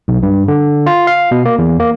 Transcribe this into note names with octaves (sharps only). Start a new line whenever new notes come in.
B1
G2
D3
F4
F5
B2
A#3
E2
A#3